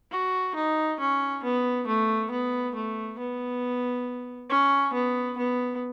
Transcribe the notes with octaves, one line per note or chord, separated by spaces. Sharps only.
F#4
D#4
C#4
B3
A3
B3
A3
B3
C#4
B3
B3